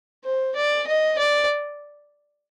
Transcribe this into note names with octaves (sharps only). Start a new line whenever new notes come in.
C5
D5
D#5
D5